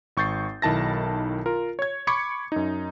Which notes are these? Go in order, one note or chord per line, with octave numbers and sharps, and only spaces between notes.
G#1 C#6 G6 A6 C7
B1 D#3 E4 A5 A6 A#6
F4 A#4
C#5 G#6
B5 C#6 D6 G#6 C#7
F#2 D#4